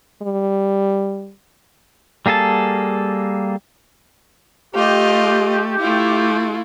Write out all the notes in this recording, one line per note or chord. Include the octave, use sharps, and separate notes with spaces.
G3
G3 A#3 G#4 A4 A5
A3 F4 G4 D#5
A3 E4 F4